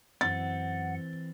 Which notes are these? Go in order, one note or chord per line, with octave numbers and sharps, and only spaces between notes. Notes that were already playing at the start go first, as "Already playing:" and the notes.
F#2 E3 C4 F#5 A6